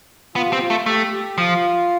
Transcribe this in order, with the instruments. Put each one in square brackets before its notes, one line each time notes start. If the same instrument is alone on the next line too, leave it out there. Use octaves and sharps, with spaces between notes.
[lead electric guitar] B3 [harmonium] F4
[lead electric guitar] C4 [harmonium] G4
[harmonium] F4
[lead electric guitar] A3
[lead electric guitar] A3 [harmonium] G4
[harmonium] G4
[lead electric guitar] F3 [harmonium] F4